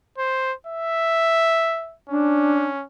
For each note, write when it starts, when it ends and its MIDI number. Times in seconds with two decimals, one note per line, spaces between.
0.18 0.53 72
0.67 1.95 76
2.09 2.84 61
2.09 2.69 62